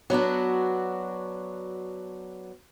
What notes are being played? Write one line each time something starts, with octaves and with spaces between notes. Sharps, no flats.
F#3 B3 D4 F#4